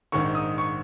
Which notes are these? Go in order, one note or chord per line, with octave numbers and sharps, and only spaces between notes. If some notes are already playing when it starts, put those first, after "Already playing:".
A#1 G#2 D#3 C#6
D#6
C#6